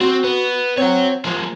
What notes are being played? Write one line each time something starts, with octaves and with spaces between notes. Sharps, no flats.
C4 F#4
B3
C4 C#5 F#5
F3 G#3 A#3